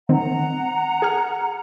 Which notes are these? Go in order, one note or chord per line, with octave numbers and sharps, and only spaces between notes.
D#3 C4 F#5 A#5
G#4 G#5 F6